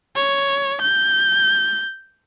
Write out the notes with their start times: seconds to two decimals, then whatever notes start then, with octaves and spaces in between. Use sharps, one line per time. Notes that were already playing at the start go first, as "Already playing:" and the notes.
0.16 C#5
0.81 G6